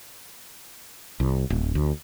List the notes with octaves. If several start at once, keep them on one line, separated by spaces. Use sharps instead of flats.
C2
D1
D2